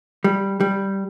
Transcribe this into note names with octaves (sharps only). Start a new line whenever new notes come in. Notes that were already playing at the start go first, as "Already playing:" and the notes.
G3
G3